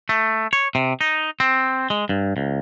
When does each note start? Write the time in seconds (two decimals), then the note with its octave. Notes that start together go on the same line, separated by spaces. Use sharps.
0.09 A3
0.53 C#5
0.75 C3
1.01 D#4
1.40 C4
1.90 G#3
2.09 G2
2.37 C#2